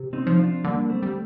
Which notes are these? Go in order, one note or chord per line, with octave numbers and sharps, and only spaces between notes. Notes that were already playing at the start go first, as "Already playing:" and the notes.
Already playing: C3
C4 D#4
F3
D4 F4
D3 G3 A#3
A3 C4
G3